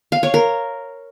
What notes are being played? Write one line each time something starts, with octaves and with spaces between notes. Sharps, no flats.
F5
C#5
A#4